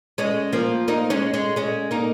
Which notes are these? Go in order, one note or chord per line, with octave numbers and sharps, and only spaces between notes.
G#3 C#4
F3 A#3
A#3 D#4
G#3 C#4
G#3 C#4
G#3 C#4
A#3 D#4